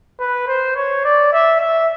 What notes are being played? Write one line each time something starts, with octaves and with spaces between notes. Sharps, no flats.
B4
C5
C#5
D5
E5
E5